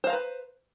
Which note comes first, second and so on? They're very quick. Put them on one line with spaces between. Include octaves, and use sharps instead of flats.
C5 F5 A#5 B4